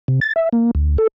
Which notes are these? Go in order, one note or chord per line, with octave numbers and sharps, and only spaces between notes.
C3
A6
E5
A#3
D2
A4